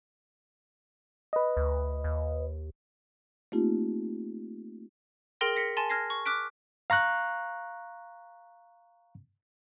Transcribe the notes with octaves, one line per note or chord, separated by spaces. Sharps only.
B4 D#5
D2
D#2
A3 A#3 C4 D#4 F4 G4
G#4 A#4 G5 C6 F6 A#6
A#6 B6 C#7
G#5 A5 C6 A6
F6 G#6 A#6 C7
C#6
D6 F6 F#6 B6 D7
F5 A#5 C#6 F#6